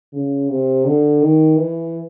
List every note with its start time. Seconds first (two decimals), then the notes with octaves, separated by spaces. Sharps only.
0.13 C#3
0.49 C3
0.85 D3
1.22 D#3
1.58 E3